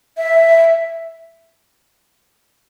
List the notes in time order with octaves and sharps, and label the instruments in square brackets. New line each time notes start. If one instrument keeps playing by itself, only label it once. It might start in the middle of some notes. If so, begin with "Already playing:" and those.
[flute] E5